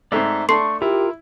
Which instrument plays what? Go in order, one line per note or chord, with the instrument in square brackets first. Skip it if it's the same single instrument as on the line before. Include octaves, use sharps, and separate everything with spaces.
[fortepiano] G#2 A3 C4 [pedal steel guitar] D5 E5 A#5
[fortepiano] A3 D4 A4 [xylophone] C6 C7 [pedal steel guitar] C#6
[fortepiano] E4 [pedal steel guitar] F4 A#4 [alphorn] G4